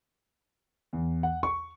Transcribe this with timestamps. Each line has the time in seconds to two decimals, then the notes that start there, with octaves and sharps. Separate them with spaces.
0.93 E2
1.23 F#5
1.43 C#6